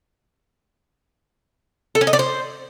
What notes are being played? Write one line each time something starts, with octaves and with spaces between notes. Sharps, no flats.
A4
C#4
D#5
D5
C5